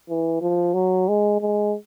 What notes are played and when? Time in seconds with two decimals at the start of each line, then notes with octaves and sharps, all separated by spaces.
0.09 E3
0.41 F3
0.74 F#3
1.08 G#3
1.41 G#3